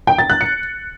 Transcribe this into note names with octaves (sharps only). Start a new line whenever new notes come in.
G5
A6
F#6
C#7